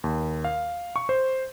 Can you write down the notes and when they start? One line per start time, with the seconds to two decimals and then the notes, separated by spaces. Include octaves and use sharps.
0.04 D#2
0.44 F5
0.96 C#6
1.09 C5